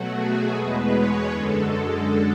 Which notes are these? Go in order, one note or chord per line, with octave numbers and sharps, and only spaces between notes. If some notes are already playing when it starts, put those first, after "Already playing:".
Already playing: B2 F#3 A3 F#4
G#4
E2 B2 G#3 B4
C#5
F#2 D3 G#3 A4
A4